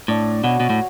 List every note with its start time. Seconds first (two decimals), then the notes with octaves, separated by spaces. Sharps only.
0.08 A2 D4
0.44 B2 F#4 C#5
0.60 B2
0.70 A2